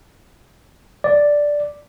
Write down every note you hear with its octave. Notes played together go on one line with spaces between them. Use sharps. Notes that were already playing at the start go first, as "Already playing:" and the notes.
D5